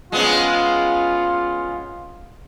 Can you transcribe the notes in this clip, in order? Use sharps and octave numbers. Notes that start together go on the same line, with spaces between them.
G#3 B3 C#4 F4